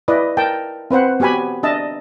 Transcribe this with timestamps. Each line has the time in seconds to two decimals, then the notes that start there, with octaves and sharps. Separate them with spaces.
0.08 E4 B4 D5 D#5
0.37 A#4 G5 A5
0.91 C4 B4 C5 F#5
1.20 B3 F#4 G4 G#5 B5
1.63 D4 D#5 E5 A5